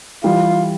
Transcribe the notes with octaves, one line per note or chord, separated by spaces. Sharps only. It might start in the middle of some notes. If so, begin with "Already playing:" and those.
E3 G3 F4